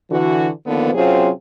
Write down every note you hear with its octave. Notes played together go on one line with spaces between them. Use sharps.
D3 E3 F#4
D3 D#3 F3 A#3 B3
C3 F#3 C4 C#4 F4 G#4